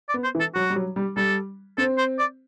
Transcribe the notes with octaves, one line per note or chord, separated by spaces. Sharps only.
D5
B3
C5
E3
A4
F#3 F#4
G3
F#3
G3
G3 A4
C4 A4
C5
D5